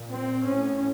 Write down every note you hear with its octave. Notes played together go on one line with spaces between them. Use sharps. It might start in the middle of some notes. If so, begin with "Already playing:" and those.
Already playing: A#2
C4
A2 C#4